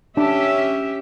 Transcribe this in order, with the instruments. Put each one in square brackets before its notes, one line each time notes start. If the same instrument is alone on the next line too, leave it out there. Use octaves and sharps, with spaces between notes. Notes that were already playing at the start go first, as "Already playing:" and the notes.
[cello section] C#4 G4 E5 [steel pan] D4